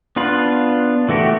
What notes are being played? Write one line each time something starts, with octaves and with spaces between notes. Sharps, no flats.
B3 D4 F4 B4
E3 A3 F#4 G4